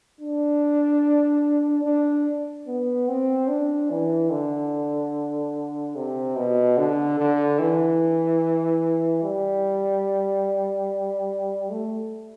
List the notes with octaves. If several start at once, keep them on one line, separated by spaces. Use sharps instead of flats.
D4
D4
B3
C4
D4
E3
D3
C3
B2
D3
D3
E3
G3
A3